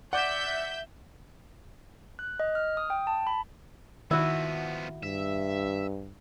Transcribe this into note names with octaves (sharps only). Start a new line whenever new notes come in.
D5 E5 F#5 D6 G6
F#6
D#5
F6
D#6
G5
A5
B5
D#3 F3 B3 E4 F#4
G2 E5